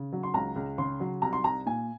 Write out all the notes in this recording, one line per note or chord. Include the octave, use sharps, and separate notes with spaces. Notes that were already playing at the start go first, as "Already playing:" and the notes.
Already playing: C#3
F#3
C6
C#2 A#5
C#2
C#3 C6
F#3
C2 A#5
C6
C2 A#5
A#2 G#5